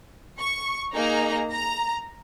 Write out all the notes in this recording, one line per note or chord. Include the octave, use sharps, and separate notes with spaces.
C#6
A#3 D#4 G#4 A#5
A#5